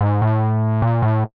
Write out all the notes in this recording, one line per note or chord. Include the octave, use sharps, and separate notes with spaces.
G#2
A2
A#2
A2